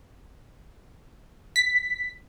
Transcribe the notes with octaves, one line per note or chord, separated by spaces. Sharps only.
B6